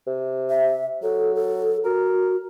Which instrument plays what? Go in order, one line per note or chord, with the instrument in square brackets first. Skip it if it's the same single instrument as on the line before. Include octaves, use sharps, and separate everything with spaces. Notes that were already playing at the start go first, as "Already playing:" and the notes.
[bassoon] C3
[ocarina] E5
[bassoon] F#3 [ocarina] A4
[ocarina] A4
[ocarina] F#4 [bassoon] A#4